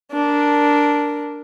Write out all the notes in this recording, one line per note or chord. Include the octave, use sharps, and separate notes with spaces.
D4 A#4